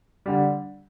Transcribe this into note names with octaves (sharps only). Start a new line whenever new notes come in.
D3 G3